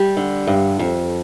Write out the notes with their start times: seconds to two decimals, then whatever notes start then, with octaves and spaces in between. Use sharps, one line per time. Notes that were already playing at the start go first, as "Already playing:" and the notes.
Already playing: G3
0.17 D3
0.47 G2
0.79 F2